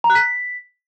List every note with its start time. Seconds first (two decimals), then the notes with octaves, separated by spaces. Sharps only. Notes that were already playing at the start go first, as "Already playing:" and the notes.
0.04 A#5
0.10 F#6
0.15 B6